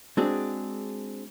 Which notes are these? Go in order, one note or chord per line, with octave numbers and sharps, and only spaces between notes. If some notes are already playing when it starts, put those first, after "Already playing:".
G#3 C4 D4 F#4 G#4